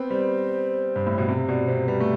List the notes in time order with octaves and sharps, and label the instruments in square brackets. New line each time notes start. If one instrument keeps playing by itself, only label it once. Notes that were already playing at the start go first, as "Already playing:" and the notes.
Already playing: [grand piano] B3 C4 [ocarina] C5
[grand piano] G3
G2
A2
B2
C3
[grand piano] B2 [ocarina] D5
[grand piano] C3 [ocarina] C5
[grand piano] G3 [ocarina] B4
[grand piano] A3